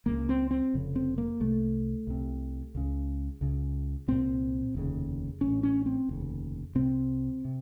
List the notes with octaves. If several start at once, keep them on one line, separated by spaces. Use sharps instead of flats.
C#2 C#3 A#3
C4
C4
F1 F2 C#3
C4
A#3
C2 C3 A3
C2 C3
C#2 C#3
C#2 C#3
C2 A#2 C4
F1 D#2 C#3
A1 A2 C#4
C#4
C4
F1 D#2 C#3
C2 C3 C4
C3